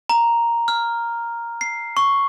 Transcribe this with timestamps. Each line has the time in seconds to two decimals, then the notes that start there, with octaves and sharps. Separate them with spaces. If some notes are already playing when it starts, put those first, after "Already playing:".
0.10 A#5
0.68 F6
1.61 C7
1.97 C#6